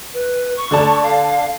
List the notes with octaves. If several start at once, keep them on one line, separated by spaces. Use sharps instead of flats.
B4
C#6
D3 D5 A5
F5